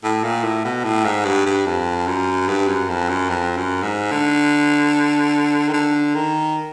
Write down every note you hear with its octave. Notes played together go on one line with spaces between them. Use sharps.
A2
A#2
A2
B2
A2
G#2
G2
G2
F2
F#2
G2
F#2
F2
F#2
F2
F#2
G#2
D3
D#3
D3
D#3